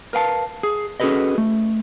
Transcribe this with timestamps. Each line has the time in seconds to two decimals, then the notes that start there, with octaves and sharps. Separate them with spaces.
0.13 A#4 B4 F5 G5 A5
0.63 G#4
1.00 C#4 F#4 G#4 A4 B4 D#5
1.38 A3